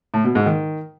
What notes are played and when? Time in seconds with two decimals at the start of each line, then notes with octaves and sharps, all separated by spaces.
0.14 A2
0.24 B2
0.35 G#2
0.46 D#3